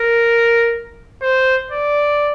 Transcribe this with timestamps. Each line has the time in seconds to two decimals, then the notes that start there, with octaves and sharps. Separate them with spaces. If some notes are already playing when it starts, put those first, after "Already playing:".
Already playing: A#4
1.22 C5
1.71 D5